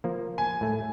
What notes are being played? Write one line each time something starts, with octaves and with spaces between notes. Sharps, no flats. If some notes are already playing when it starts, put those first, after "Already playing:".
F3 A#3
G#5
A2 A3